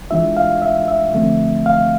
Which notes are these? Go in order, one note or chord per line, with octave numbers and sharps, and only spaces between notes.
E3 G#3 D4 F4 E5
F5
E5
E5
D3 F3 A3 C4
F5